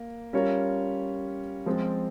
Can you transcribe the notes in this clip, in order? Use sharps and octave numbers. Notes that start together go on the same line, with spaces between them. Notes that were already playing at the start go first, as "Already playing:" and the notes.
Already playing: A#3
G3 C#4 F4 A#4 C#5
F3 G#3 C4 F4